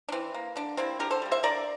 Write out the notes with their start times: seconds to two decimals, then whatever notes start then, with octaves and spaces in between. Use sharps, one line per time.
0.08 D4
0.12 E3 C4
0.34 A#3
0.56 D3 D4
0.77 G3 A#3 C4 E4
0.99 D3 G4 A#4
1.10 A4 C5
1.22 G3 A#3
1.31 C5 E5
1.43 D3 A#4 D5